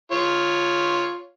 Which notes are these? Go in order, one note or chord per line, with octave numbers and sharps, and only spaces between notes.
F4 C#5